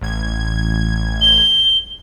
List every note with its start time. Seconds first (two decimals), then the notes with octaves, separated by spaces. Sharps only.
0.01 A1 G#6
1.21 G7